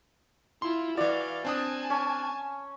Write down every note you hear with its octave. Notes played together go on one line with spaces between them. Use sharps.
E4 F4 C6
E3 F#4 D5 F5
C4 D4 G#5 A5 D#6
C#4